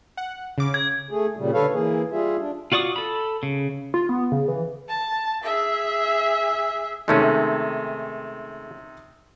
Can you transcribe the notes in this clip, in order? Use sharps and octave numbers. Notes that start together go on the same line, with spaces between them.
F#5
C#3 D6
G#6
A3 G#4
A#2 C#3 G3
D3 A4 B4 C#5 F5
E3 A#3 G#4
G3 F4 G#4 E5
D4
F4 F#4 D5 C#6 D#6
A4 B5
C#3
F4
B3
C#3
E3
A5
G#4 E5
C3 D#3 G#3 A3 C#4 D#4